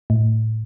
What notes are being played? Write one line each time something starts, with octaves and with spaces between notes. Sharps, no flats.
A2